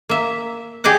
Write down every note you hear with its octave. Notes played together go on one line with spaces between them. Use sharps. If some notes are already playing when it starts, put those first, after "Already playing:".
A#3 E5
G4 G#4 D5 D#5 F#5